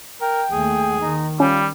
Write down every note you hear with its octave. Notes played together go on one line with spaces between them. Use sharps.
A#4 G5
D#2 A3 G#4
D#3 D#4
G3 C#4 F4